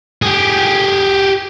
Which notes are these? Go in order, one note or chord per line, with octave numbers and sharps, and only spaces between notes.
G4 G#4